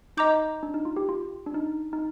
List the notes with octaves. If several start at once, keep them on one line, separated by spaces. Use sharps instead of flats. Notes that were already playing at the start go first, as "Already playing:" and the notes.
D#4 D#5 A#5 D6 G6
D4
D#4
F4
G4
F4
D4
D#4
D#4